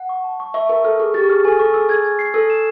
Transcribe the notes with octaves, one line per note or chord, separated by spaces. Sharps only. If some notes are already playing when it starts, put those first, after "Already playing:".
Already playing: F#5
C#6
A5
C#6
E5 C#6
A#4 C#6
A4 F6
G#4 C#6
G4 A6
G#4 F6
A4 G#5
A4 C#6
G#4 E6
G#4 G#6
G#6
C7
A4 E6
E7